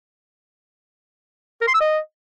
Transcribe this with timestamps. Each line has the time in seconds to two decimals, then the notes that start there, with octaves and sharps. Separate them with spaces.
1.61 A#4
1.68 C6
1.74 E6
1.81 D#5